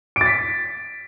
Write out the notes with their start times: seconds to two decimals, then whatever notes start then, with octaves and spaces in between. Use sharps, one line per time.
0.16 D7
0.21 A6
0.26 B6